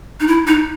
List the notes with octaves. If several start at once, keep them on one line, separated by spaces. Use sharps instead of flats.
D#4
E4
D#4